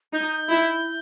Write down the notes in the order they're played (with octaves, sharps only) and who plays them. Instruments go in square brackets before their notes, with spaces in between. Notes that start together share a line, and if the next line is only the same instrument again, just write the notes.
[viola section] D#4 [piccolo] G6
[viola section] E4